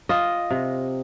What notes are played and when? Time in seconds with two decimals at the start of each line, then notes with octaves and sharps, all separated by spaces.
0.09 F4 D#5
0.51 C3